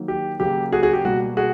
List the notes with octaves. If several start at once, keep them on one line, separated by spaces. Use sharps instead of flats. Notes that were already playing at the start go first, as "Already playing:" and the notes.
Already playing: D#3 F#3 A#3
G4
C#3 F#3 A#3 G4
F#4 G#4
F#4 G#4
G4
B2 G3 A#3 F#4
F#4 G#4